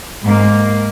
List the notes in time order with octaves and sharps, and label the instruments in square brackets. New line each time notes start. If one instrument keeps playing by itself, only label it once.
[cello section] G#2 A#3